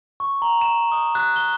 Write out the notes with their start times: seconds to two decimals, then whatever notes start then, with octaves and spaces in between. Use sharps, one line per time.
0.20 C#6
0.42 A#5
0.61 E7
0.92 D#6
1.15 F#6
1.36 G7